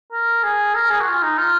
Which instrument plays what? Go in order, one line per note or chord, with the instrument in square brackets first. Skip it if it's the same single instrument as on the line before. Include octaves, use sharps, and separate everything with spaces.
[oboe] A#4
G#4
A#4
G#4
F#4
F4
D#4
F4